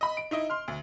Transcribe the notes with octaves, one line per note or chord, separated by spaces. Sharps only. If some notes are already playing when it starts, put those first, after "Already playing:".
D#5 B5
D7
D#4 E4 D#5
C6 F6
D2